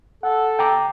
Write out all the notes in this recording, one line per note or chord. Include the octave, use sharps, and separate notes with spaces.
A4 F#5
G5 A#5 D6